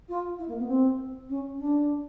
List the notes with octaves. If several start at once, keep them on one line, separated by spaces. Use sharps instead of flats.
F4
E4
A#3
B3
C4
C#4
D4